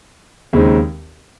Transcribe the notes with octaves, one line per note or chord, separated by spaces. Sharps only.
D#2 C#3 G#3 C4 D#4